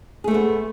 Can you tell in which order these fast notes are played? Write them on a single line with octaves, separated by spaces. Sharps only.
G#4 A3 C5 B3